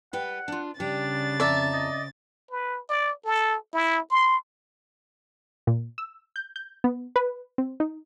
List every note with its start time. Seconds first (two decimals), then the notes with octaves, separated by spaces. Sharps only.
0.13 G3 B4 F#5 G5
0.48 D4 F4
0.80 C#3 G3 D4 D5 A6
1.40 F2 D5 E5 A5 A#5
1.73 D#5
2.51 B4
2.89 D5
3.25 A4
3.73 E4
4.11 C6
5.67 A#2
5.98 E6
6.36 G6
6.56 G6
6.84 B3
7.16 B4
7.58 C4
7.80 D#4